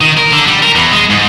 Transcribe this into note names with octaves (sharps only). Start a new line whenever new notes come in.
D#3
A#4
D3
G3
A#4
E2
G#3
G#2